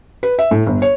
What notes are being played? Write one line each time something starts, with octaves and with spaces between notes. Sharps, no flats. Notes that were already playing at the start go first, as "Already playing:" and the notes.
B4
E5
A2
G1
C#5